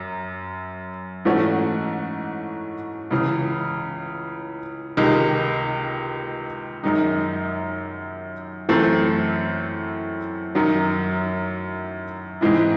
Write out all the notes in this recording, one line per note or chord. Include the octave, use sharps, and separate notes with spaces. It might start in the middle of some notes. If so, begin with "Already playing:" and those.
Already playing: F#2
G#2 E3 A3 C#4 F#4
C#2 C#3 E3
C#2 C3 D#3 G#3
F#2 D#3 G#3 D#4
F#2 E3 A3 C4
F#2 D#3 F#3
G#2 E3 G#3 C4 E4